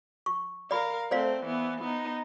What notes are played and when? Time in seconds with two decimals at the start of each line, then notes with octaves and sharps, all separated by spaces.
0.26 C#6
0.71 A#4 D5 F5 B5
1.11 A3 C4 C5 D5 F5
1.44 E3 B3
1.80 B3 D#4